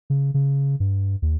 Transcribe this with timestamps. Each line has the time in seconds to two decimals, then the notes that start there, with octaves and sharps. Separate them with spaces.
0.10 C#3
0.34 C#3
0.80 G2
1.22 D#2